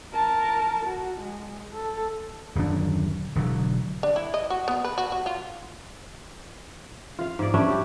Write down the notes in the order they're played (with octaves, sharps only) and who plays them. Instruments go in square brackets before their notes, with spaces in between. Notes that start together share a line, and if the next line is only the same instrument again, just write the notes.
[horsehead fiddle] A#4 A5
F#4
G#3
A4
[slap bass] D#1 F#2 D3 D4
E1 D3 F#3
[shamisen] D4
E4
D#5
F#4
B3
B4
F#4
F#4
F4
[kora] F4 F5
G#2 G#4 D5
G3 A3 C#4 D4
G4